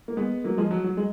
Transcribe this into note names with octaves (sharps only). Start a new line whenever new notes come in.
A#3
G#3 B3
F#3 A#3
F3 G#3
F#3
F#3
G#3